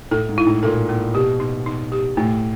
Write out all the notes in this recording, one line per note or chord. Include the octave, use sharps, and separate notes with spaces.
A2 A4
G#2
E4
A2
A#2 A4
A#3
B2 G4
D#4
D#4
G4
A2 A3